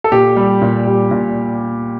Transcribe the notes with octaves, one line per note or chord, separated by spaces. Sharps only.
A4
A#2 G4
G3
A#2
G3
A#2